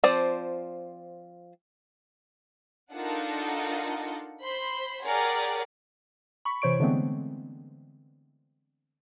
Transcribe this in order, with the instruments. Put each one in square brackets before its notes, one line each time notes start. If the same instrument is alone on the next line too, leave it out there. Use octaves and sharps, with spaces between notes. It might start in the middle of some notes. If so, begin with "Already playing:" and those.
[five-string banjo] F3 C4 C5 D5
[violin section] D4 D#4 F4 A4 A#4 F#5
C5 B5 C6
G4 G#4 A#4 C#5 D5 F#5
[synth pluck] B5 C#6
C3 E3 C5 C#5 C#6 D7
D3 E3 G#3 A3 B3 C4